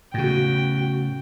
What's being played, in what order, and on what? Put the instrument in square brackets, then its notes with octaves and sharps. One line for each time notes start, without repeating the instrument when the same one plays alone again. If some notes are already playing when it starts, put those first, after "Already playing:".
[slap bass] A2 C#3 [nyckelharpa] F#4 G5